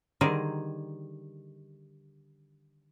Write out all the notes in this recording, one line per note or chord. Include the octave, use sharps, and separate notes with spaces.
D3 D#3 G3 G#4 A#4 C5